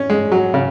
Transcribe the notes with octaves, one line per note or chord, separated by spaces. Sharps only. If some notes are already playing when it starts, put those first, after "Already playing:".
Already playing: C#4
G#3
F#3
C#3